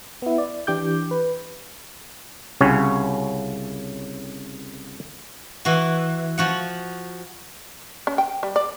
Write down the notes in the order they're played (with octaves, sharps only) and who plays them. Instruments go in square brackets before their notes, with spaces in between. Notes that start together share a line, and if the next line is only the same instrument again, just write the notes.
[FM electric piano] B3 E4
D5
E3 D4 G4 D6 G6
B4
[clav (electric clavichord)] C2 C#3 C#4 F#4 C#5
[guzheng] E3 F#4
F3 F#4 F#5
[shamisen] C#4
G5
G3
D5